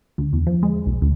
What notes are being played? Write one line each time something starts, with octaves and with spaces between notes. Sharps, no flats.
D2
E2
F3
G#3
B1
D2